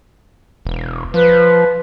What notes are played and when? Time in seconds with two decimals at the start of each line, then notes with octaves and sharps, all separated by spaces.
0.65 E1
1.14 F3 B4